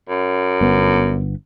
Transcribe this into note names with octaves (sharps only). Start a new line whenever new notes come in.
F#2
G1 B3